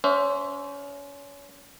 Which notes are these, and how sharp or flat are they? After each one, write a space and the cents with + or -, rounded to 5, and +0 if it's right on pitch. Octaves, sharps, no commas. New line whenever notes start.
C#4 +30 C5 +0 E5 +0